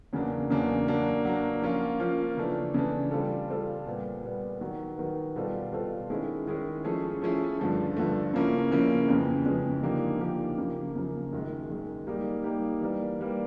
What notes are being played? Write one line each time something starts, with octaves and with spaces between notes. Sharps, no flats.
E2 C#3 F#3 A#3 D4
E2 C#3 F#3 A#3 D4
F#3 A#3 D4
F#3 A#3 D4
F3 A#3 C#4 F4
F3 A#3 C#4 F4
C#3 E3 A3 D4
C#3 E3 A3 D4
G3 C4 F4 A4
G3 C4 F4 A4
A#2 G3 B3
A#2 G3 B3
D#3 F#3 B3
D#3 F#3 B3
B2 G3 C4 F4 A4
B2 G3 C4 F4 A4
D#3 G#3 C#4 E4 G#4
D#3 G#3 C#4 E4 G#4
F3 A3 C#4 E4 G#4
F3 A3 C#4 E4 G#4
G2 D3 F3 A3
G2 D3 F3 A3
C#3 F3 A#3 C#4 E4
C#3 F3 A#3 C#4 E4
F2 C#3 E3 G#3
F2 C#3 E3 G#3
D3 F3 A#3 D#4 G4
D3 F3 A#3 D#4 G4
F#2 C#3 F3 A#3
F#2 C#3 F3 A#3
F#2 D#3 G#3
F#2 D#3 G#3
G3 A#3 D#4 G4
G3 A#3 D#4 G4
E3 G3 A#3
E3 G3 A#3